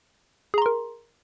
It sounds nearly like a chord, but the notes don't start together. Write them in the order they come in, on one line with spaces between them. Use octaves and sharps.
G#4 A#5 C6 A#4